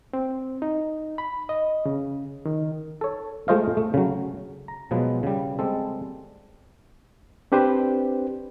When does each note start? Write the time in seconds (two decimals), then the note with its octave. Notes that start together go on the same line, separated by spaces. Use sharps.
0.13 C4
0.62 D#4
1.18 B5
1.49 D#5
1.86 C#3
2.45 D#3
3.01 A4 C#5
3.48 G#3 A3 F4 C5 D#5 F5
3.77 A3
3.94 C#3 F#3
4.68 A#5
4.91 B2 F3 F#3 G#3 B3
5.23 C#3 G3
5.59 G3 G#3 C4 A4
7.52 C4 D4 G4 B4 C5